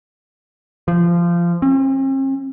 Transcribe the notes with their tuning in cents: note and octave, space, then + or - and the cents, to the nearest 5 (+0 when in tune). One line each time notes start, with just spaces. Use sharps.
F3 -20
C4 +45